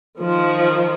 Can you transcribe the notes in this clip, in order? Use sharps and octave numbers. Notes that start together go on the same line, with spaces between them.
D#3 F3